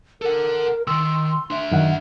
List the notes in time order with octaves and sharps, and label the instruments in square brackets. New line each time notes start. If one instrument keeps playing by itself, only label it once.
[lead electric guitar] A4 F#5 [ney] A#4
[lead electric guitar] D#3 [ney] C6 [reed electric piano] E6
[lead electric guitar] D4 E5
[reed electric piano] F#2 D#3 F#5